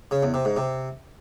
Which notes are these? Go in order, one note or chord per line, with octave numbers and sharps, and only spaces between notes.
C#3
E2
C3
G#2
C3